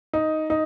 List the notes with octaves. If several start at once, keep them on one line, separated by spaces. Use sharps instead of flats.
D#4
D#4